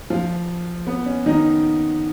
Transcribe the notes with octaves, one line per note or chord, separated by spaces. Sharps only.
F3 F4
B3
C#4
D#3 D#4